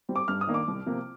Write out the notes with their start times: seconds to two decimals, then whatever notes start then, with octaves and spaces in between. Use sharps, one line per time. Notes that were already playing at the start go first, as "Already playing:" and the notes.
0.09 G3 C4
0.16 D6
0.28 G2 F6
0.41 D#6
0.47 D#3 A#3 D4
0.54 D6
0.68 C2
0.86 C3 F3 A#3